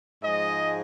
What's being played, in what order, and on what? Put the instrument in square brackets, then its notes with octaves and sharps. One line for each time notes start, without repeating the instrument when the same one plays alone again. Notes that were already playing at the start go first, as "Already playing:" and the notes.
[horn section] G#2 F3 G#3 D#5